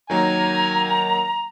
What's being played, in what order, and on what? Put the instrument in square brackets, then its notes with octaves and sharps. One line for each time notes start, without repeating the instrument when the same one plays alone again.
[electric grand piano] D#3 F#3 A#3 [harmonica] G#5 [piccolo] A#5